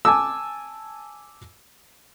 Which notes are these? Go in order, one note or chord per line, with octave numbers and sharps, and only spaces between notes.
G#5 A5 D6 E6